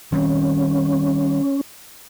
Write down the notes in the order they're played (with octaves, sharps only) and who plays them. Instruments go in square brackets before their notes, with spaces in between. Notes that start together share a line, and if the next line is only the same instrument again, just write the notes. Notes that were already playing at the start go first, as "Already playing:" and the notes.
[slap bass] D#3 G3 C4 [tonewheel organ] C#4